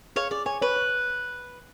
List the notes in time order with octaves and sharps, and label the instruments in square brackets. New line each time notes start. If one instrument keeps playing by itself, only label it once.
[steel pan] G#4 [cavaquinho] C#5 F5
[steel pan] G#4 [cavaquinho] D5
[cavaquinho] C#5 [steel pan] G#5
[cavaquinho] B4 [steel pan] C#5
[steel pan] C#5